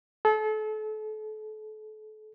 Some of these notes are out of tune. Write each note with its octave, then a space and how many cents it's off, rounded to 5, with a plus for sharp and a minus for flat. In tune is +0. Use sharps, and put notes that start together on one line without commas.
A4 -35